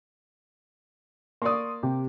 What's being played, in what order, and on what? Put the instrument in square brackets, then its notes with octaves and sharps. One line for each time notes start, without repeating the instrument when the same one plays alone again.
[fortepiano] A#3 D5 [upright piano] C6 C#6 D#6
[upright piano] C3 G4